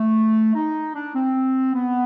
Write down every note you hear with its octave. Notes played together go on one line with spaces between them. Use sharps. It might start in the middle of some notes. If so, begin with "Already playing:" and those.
Already playing: A3
D#4
D4
C4
B3